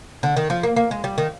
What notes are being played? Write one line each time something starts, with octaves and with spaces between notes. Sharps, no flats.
D3
D#3
F3
A#3
A#3
G#3
G3
D#3